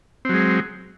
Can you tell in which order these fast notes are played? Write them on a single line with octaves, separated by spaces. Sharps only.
C4 F#3 G#3